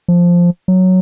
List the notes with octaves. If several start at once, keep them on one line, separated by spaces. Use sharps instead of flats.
F3
F#3